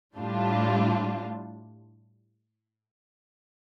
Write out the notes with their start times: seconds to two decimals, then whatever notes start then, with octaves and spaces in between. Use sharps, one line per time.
0.16 A2 G3 D4 F4